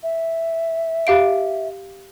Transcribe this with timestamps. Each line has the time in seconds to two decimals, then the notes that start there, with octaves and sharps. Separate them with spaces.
0.03 E5
1.07 G4 F5 D7